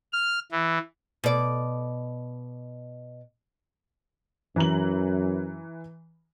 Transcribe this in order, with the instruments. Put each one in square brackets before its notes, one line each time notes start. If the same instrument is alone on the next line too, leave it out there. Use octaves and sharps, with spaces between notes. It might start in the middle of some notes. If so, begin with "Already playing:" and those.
[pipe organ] F6
E3
[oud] B2 D5
[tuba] F#2 [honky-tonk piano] E3 A#5 F#7